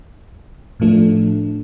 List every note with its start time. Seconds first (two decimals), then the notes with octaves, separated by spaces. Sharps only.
0.80 A2 F3 A3 D4